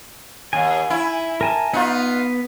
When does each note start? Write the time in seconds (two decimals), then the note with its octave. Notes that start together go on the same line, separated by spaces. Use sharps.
0.53 D#2 G#5
0.90 E4
1.41 A#4 G#5 A5
1.73 B3 D#4 F4 B4